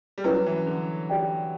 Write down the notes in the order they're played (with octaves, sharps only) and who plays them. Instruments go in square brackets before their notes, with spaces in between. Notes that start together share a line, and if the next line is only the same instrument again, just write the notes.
[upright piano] G3
[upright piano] F#3 [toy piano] C#4 E4 B4
[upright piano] E3
D3
[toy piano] G4 D5 G5